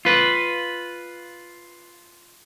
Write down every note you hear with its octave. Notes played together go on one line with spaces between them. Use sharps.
F4 B4